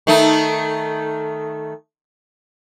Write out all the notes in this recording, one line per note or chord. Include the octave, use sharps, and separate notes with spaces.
D#3 A3 D#4